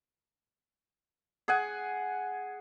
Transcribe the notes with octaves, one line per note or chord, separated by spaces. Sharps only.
G#4 F#5 G#5